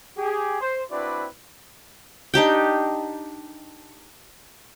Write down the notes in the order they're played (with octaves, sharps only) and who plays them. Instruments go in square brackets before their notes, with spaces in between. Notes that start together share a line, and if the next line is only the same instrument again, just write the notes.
[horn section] G4 G#4
C5
C4 D4 E4 F#4 B4 D5
[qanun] D4 D#4 G4 G5